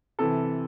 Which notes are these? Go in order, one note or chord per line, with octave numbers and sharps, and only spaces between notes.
C3 E3 A4